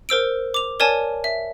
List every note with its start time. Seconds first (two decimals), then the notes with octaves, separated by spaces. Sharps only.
0.09 A#4 C5 E6 D7
0.54 D6 F7
0.80 A#4 C#5 D5 G#5 A5
1.24 E5